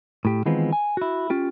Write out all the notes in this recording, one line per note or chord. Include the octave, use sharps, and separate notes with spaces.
A2 G4
D#3 E3 G#3 B3 C4 F4
G#5
E4 F#4
C#4 F4 G4